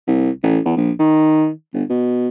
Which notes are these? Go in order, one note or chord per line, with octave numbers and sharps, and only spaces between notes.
C2
A1
E2
A#1
D#3
G1
B2